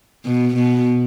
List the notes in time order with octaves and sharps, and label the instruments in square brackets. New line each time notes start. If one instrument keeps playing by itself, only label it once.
[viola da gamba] B2
B2